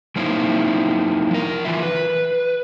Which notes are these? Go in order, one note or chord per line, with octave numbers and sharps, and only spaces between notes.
F#3 A#3 C4 D#4 E4
F3 A#4
E3 F4 E5
B4